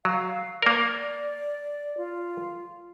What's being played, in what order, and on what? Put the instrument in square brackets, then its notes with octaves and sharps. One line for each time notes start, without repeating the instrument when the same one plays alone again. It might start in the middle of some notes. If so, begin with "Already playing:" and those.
[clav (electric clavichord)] F#3 [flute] F5
[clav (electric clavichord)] A#3 A#4 [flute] D5
[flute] F4